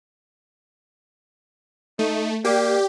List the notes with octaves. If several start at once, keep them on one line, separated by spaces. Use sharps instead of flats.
A3 D#4
A#3 G4 D5